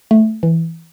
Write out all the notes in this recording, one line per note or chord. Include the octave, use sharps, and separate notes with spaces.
A3
E3